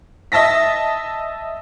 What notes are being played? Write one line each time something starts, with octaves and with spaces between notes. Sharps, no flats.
D#5 E5 A5 A#6 B6